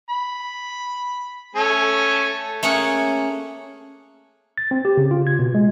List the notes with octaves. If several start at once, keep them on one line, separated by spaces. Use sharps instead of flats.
B5
A3 C#4 A4
A3 A#3 C#4 G#4 C#5 F#5
A6
C4
G4
C#3
F4
G#6
B2
G#3